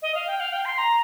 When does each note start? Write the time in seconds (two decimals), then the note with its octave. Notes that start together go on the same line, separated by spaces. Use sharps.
0.02 D#5
0.15 F5
0.27 G5
0.40 F5
0.53 G5
0.65 C6
0.78 A#5